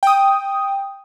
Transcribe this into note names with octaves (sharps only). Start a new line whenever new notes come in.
G5 D#6